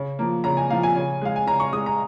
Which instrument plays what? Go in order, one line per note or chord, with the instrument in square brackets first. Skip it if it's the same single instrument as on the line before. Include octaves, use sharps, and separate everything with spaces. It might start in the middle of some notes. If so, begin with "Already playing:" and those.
Already playing: [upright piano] C#3
F3 A#3
C#3 A#5
G#5
F3 A#3 F5
G#5
C#3
G#3 F5
G#5
C#3 A#5
C#6
G#3 D#6
A#5